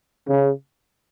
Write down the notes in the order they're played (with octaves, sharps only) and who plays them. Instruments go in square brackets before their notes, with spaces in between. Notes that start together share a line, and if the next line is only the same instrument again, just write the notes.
[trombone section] C#3